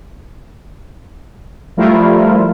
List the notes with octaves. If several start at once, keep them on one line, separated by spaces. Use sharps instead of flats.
F3 G3 A3 E4 F4 A#4